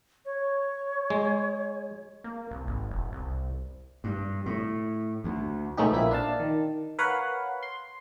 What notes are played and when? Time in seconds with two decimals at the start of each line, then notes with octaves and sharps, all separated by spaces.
0.25 C#5
1.10 G#3
2.24 A#3
2.51 C2
2.67 G#1
2.91 E1
3.12 C2
4.04 G2
4.46 A2
5.24 D2
5.77 B2 G#3 A3 C#4 D#4 G4
5.91 A#1 F3 A#3 E4 B6
6.11 D4 F5 A5
6.40 D#3
6.98 A#4 B4 C#5 F5 F#5
7.63 C6